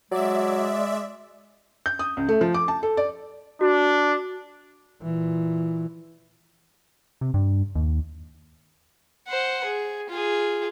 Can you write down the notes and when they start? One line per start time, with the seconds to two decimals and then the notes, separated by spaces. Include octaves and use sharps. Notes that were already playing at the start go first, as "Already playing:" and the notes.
0.11 F#3 G#3 D5 E5
1.86 G6
1.99 D#6
2.17 C#2
2.29 A3
2.41 F3
2.54 D6
2.68 A5
2.83 A4
2.97 D5
3.61 D4 F#4
5.02 A#2 E3
7.21 C3
7.34 G2
7.75 D#2
9.28 C5 F#5
9.64 G#4
10.09 F4 G#4